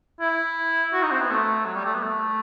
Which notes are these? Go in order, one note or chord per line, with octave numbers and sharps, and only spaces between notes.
E4
F#4
D#4
C4
B3
A3
F#3
G3
A3
B3
A3